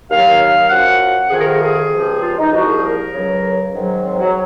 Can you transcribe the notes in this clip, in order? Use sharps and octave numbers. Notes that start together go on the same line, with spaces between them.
D#2 D#3 F#3 F5
F#2 F3 F#5
F2 C3 D#3 G#4
A#4
G#4
G#4
C#2 C3 F3
F4
D#4
C2 A#2 F3 F#4
G#4
A#4
C#2 C#3 F#3
G#2 D#3 F#3
C4
F#3